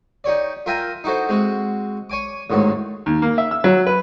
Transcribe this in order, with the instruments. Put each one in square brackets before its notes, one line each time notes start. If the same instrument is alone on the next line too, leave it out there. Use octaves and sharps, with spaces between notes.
[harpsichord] D#4 G4 C#5 D5
F4 A#4 E5 G5 G#5 A#5
D#4 E4 F#4 A4 C5
G#3 C4 F#4
C#5 G#5 D6
A1 D#2 G#2 F#3
[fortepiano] D#2
A#3
E5
E6
F#3
B4